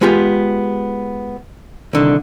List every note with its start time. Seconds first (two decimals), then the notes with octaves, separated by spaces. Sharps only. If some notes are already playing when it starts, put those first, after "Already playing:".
0.01 G#3 B3 F4 G4 G#5
1.93 C2 D3 D#3